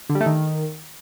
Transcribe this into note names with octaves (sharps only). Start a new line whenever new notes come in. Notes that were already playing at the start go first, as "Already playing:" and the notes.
D3
G3
A3
D#3